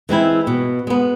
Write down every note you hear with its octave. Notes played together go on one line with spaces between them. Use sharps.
E3 G#3 C4 E4
B2
G#3 B3